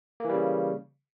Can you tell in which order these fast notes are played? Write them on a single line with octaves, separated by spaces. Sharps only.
A#3 E3 G3 C#3